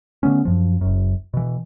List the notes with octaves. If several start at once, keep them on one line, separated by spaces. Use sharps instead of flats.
D3 A3 B3 C#4
F#2 F3
F#1 F#2
B2 E3